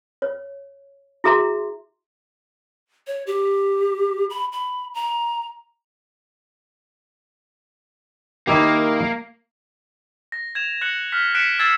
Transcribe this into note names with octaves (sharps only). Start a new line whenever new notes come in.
C#5
E4 F#4 G#4 E5 A#5 C6
C#5
G4
B5
B5
A#5
D#3 A#3 E4 G4
A#6
G#6 E7 F7
F#6 A#6 C#7 F#7
F6 F#6 B6
F#6 B6 C#7 D7 E7
E6 G#6 A6 C7 E7